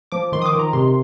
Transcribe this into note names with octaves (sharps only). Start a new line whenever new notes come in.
F3 D6
D#3 C6
D#6
D6
D#3
A#5
C3 C6